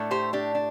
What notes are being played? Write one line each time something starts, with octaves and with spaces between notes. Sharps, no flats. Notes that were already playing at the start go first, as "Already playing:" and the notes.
Already playing: A2 A3 D4
G4 C5
D4 G4
D4